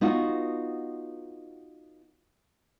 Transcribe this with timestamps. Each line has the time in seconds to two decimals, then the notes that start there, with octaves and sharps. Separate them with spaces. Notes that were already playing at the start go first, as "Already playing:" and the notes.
0.01 B3 D#4 F4 F#4